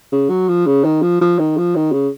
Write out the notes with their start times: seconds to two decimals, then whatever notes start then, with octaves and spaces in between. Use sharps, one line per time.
0.12 C#3
0.30 F#3
0.48 F3
0.67 C#3
0.84 D#3
1.02 F3
1.21 F3
1.39 D#3
1.57 F3
1.76 D#3
1.92 C#3